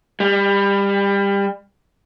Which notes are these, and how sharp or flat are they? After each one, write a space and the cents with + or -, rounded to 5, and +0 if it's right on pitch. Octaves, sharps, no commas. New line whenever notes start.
G3 +25